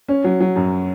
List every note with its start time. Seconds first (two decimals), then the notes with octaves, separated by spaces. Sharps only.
0.08 C#4
0.24 F#3
0.41 F#3
0.56 F#2